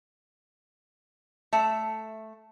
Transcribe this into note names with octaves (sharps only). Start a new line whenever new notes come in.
A3 E5